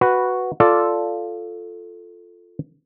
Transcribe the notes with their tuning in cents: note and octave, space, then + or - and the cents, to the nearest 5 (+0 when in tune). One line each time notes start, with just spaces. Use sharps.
F#4 +0 B4 +0
F4 +0 A4 +0 D5 +0